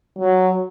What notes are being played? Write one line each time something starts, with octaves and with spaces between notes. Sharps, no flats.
F#3